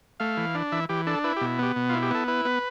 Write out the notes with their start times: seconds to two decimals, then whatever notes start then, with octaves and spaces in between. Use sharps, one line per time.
0.20 A3 F5
0.37 E3
0.55 D4
0.72 E3 E5
0.89 E3 G4
1.07 D4 A4
1.24 E4 B4
1.37 G4
1.41 B2
1.59 B3 G4
1.76 B2
1.89 E4 F4
2.02 G4
2.11 B3 A4
2.28 E4 B4
2.45 B3